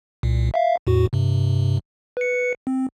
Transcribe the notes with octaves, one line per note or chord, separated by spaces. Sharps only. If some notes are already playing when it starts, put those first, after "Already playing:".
C2 A#2
E5 F5
E2 A2 F#4
G2 C3
B4 C#7
C4